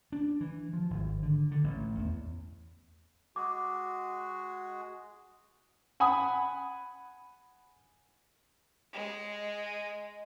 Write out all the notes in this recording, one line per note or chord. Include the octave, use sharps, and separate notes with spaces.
D4
E3
F3
G#1
D3
D3
A1
E2
G#3 F#4 G#4 D6
F#5 G#5 B5 D#6
G#3